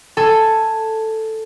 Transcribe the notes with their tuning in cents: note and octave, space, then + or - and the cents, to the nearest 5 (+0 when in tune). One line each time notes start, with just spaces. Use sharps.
A4 +5 G#5 +5